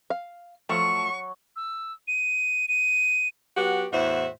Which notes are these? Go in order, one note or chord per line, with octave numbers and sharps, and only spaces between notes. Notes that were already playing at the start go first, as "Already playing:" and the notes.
F5
F3 F#3 A3 C#6
E6
D#7
D#7
F#3 B3 F#4 G4
E2 A2 F#4 C5 E5